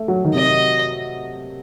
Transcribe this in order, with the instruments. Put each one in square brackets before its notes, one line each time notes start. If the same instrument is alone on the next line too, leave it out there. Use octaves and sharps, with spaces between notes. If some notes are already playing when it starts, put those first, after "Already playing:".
Already playing: [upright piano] A3
F#3
D#3
[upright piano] C3 [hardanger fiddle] D#5